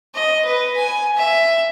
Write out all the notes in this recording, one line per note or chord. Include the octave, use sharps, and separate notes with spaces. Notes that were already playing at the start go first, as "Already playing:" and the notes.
D#5
B4
G#5
E5